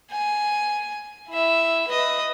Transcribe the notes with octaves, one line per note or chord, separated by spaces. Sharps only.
G#5
E4 E5
B4 D#5